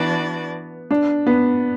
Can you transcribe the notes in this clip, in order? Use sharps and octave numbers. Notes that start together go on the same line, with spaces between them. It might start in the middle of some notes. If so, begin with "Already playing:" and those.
Already playing: E3 B3 D4 F#4 D5
D4
B3